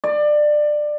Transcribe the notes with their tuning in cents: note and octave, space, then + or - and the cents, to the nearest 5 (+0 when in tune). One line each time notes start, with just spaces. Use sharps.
D5 +20